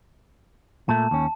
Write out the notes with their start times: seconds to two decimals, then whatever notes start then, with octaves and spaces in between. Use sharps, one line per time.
0.89 A#2 A3 A5
1.11 D#2 C#4